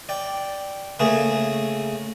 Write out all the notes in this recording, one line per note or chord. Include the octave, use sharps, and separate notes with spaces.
D5 G5
C#3 A3 A#3 G#4